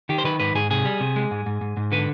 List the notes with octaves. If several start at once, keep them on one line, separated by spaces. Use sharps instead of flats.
D#3 G4
C5
D#3 B4
G#2 B4
G#2 G#4
C3 G#4
G3
C3
G#3
G#2
G#2
G#2
G#2
D3 B4